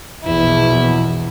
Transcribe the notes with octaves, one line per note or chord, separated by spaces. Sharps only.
A#1 E2 B2 E4